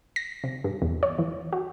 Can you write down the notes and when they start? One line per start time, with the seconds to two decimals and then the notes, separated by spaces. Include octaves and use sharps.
0.16 A#6
0.44 C3
0.64 G2
0.82 E2
1.03 C#5
1.19 E3
1.53 F#4